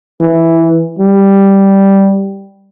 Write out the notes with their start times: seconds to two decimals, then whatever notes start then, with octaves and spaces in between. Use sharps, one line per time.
0.20 E3
0.99 G3